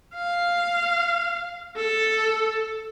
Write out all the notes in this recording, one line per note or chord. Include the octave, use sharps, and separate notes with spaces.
F5
A4